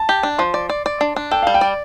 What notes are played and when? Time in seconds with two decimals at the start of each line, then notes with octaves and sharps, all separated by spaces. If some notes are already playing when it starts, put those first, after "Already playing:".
Already playing: A5
0.09 G4
0.23 D4
0.38 F3 C6
0.54 D5
0.69 D5
0.86 D5
1.01 D4
1.16 D4
1.31 A4 G5
1.42 G3 F5
1.54 G5
1.61 D5